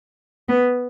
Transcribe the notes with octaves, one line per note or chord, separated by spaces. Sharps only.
B3